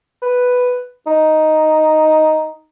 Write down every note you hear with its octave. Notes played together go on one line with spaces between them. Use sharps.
B4
D#4